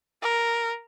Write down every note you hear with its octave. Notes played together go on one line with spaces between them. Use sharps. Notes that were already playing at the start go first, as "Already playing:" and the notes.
A#4